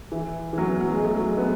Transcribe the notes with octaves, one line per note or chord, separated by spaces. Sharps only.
E3
E3
F#3
B3
F#3
G#3
A3
F#3
G#3
B3